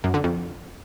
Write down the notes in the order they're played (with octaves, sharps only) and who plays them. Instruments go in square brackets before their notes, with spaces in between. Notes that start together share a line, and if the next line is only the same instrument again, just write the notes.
[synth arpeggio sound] F#2
D3
F2